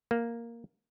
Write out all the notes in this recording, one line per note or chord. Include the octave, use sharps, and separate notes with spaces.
A#3